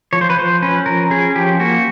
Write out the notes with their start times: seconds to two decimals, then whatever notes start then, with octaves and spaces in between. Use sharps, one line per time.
0.13 F3 C#5
0.21 C5
0.30 B4
0.37 F3 C5
0.62 C#4 B4
0.86 F3 A#4
1.10 C#4 G#4
1.36 F3 G4
1.60 A#3 F#4